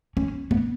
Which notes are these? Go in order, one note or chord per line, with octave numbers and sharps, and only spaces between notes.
C#4
B3